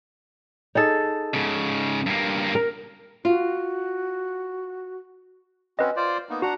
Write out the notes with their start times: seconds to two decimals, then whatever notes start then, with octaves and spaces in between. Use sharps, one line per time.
0.75 D#4 G#4 A4
1.34 G#2 C#3
2.06 G2 A#3
2.55 A#4
3.25 F4 F#4
5.79 C4 C#4 F#4 B4 D#5
5.96 F4 C5 D5
6.30 A#3 B3 D#4
6.42 D4 F#4 F#5 A#5